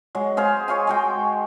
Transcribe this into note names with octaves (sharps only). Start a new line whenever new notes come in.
F#3 G#3
G#3 G#4 C5 F5
C5 C#5 F5 G#5
G#3 F#4 G5